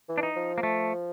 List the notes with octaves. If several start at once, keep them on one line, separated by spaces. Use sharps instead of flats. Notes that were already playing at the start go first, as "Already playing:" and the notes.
E3
D4
D#4
F3
A#3
A3